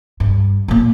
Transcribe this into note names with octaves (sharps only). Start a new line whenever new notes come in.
G2
A#2 A#3